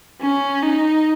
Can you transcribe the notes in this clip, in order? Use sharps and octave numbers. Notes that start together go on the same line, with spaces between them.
C#4
D#4